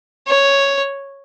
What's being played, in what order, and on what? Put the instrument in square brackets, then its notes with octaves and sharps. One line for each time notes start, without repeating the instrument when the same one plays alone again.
[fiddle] C#5